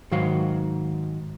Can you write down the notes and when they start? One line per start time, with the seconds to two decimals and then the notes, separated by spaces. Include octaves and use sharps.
0.11 G#2 D#3 F#3 F#4 F5